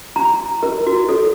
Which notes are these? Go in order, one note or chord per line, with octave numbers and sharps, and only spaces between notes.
A#5
A#4
F#4
A4